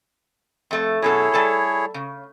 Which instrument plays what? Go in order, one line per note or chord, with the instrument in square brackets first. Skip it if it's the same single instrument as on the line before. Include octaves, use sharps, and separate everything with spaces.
[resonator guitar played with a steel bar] F2 A3
[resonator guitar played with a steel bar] F#2 B2 A4 [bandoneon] E4 G#4 C#5
[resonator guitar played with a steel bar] G3 A4 A5
C#3